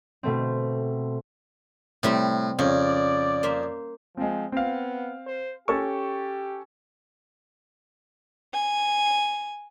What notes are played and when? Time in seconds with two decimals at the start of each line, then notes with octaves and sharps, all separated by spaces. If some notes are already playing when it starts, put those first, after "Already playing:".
0.23 B2 A3 C4
2.03 A2 C3 G3 C4
2.59 F2 C#3 D5
3.43 A#3 C5 E5
4.17 F3 G#3 C4
4.52 B3 C4 F5
5.26 C5
5.68 C#4 G4 A4 C#6
8.54 G#5